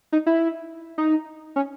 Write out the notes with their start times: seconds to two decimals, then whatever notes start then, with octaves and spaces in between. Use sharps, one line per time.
0.12 D#4
0.26 E4
0.98 D#4
1.56 C#4